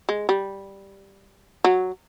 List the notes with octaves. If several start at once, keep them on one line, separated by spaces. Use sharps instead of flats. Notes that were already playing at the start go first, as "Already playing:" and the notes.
G#3
G3
F#3